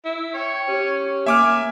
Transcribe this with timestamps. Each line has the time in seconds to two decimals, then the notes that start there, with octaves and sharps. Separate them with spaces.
0.05 E4
0.34 C#5 G5
0.68 C#4 G4
1.26 A#3 E5 G#5 D6 F6